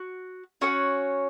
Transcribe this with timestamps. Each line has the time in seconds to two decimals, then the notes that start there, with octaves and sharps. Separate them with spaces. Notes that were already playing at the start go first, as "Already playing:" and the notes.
Already playing: F#4
0.61 C#4 F#4 C#5 F#5